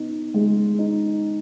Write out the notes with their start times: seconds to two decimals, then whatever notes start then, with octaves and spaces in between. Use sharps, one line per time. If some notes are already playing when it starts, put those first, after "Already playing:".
Already playing: B3 D#4
0.34 G#3
0.79 D#4